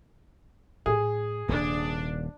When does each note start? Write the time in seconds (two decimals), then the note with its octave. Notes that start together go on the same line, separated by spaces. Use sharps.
0.86 A2 G#4
1.49 D#1 C3 G3 D4